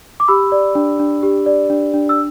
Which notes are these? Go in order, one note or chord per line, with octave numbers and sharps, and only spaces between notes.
D6
G4 B5 E6
D5
D4
D4
G4
D5
D4
D4
E6